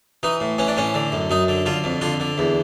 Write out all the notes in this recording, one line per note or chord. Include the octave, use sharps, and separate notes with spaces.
E3 D#4
A2
E3 C#4
D4
A2 C#4
D3
F#2
F#2 D#4
D3
D3 F4
F2
D3 F4
D3
E2